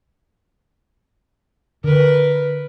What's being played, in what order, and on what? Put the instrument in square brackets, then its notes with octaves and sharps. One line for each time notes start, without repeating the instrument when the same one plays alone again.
[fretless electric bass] D3 [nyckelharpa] A#4 B4